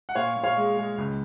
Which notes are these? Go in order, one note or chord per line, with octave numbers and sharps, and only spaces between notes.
F#5
A#2 C#5 F5
A#2
C#5 F5
G#3
G#3
C#2